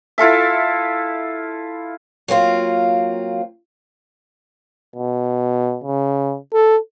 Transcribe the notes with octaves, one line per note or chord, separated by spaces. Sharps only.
E4 F4 A4 E5
F#3 A#3 C4 F4
B2
C#3
A4